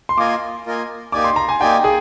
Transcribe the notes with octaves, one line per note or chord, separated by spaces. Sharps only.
C6
A#3 F4 A#4 D#5 G#5 D6
A#3 F4 A#4 D#5 G#5
A#3 D#4 G4 D5 G#5 D6
C6
A#5
G#5
A#3 D#4 G4 D5 G5 G#5
G#4